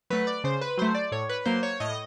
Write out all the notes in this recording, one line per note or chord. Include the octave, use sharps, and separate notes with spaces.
F#3 A3 B4
D5
C#3 C5
B4
F#3 A3 C5
D5
A2 C#5
B4
F#3 A#3 C5
C#5
A2 D#5